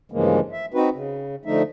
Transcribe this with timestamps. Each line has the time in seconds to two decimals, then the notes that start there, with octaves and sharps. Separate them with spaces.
0.12 G2 C#3 E3 F3 G#3 A#3
0.52 E5
0.74 C4 D#4 F#4 B4
0.94 C#3
1.45 D3 F3 A3 D#4 E5